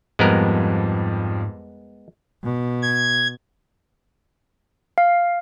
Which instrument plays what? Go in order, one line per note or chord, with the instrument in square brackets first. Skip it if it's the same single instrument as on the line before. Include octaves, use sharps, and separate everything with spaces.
[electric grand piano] F2 F3 G3 [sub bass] G#2 [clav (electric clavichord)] G#3 B3 A#4
[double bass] B2
[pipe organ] G#6
[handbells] F5